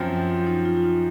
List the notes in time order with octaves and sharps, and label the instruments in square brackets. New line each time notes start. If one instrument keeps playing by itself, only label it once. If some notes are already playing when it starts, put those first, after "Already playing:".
Already playing: [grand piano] F#2 F3 C4 [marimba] F4
[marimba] F4
D#4
F4
F4
D#4